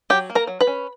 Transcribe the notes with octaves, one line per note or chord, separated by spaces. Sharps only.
F#3 G4 G5
A#3
A#4 A#5
F#3
B4 B5
C#4